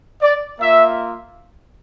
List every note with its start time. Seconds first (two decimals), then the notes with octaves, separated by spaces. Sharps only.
0.21 D5
0.59 A#3 F4 E5